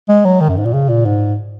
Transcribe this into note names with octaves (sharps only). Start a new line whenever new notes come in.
G#3
F#3
D#3
F#2
G#2
A#2
C#3
A#2
G#2